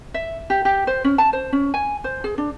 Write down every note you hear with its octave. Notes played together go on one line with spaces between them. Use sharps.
E5
G4
G4
C5
C#4
A5
C5
C#4
G#5
C5
G#4
D4